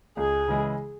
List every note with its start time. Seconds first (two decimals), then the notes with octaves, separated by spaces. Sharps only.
0.17 C#2 G#4
0.48 C#3 E3 G#3 E4